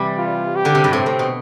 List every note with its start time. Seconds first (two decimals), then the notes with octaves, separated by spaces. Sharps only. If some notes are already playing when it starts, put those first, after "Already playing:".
Already playing: C3 E3 G3
0.18 F4
0.56 G4
0.65 D3
0.75 C3
0.84 G2
0.93 A2 C4
1.06 A2
1.19 B2